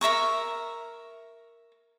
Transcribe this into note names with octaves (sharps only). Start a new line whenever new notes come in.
A#4 E5 A#5 C#6